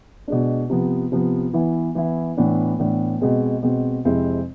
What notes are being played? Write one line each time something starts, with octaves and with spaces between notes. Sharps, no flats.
B2 G#3 D4
C3 F3 B3
C3 F3 B3
E3 B3 E4
E3 B3 E4
A2 E3 B3 D4
A2 E3 B3 D4
B2 G#3 C4
B2 G#3 C4
F2 C3 G#3 C4 E4